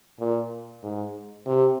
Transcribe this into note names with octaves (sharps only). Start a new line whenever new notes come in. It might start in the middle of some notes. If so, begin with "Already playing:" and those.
A#2
G#2
C3